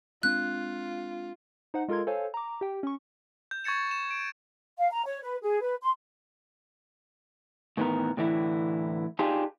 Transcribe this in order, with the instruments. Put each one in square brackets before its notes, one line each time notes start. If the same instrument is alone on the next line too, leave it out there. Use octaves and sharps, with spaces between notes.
[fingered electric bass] G#3 C4 D4 [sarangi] F4 [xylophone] F#6
[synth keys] D#4 C5 F#5
G#3 F4 A4 A#4 C6 G#6
A4 C5 C#5 F5 G#5
A#5 D6
G4 G5
C#4 C#6
[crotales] G6
C#6 G#6 A6 C#7 E7
E7
D7
[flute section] F5
A#5
C#5
B4
G#4
B4
C6
[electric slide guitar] A2 D#3 E3 G#3 B3 A#4
A2 D3 E3 E4
D4 D#4 F4 G4 G#4